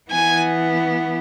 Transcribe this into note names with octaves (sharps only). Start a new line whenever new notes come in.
E3 B3 G#5